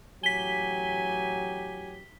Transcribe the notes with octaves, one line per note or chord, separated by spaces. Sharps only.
A1 F#3 G4 G#5 B6 G7